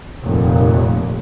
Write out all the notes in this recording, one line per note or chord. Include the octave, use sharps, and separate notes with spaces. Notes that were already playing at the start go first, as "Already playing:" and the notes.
F1 D#2 A#2